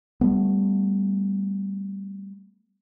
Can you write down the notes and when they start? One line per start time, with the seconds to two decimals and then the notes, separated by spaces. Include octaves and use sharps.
0.21 G3 A3 B3